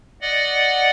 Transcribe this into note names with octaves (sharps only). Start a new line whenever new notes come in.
D5 D#5 F#5